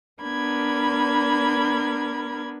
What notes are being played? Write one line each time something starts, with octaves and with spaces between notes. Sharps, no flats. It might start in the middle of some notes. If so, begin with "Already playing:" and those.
B3 D4 A#4 B5 G#6